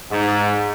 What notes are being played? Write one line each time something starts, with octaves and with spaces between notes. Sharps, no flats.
G#2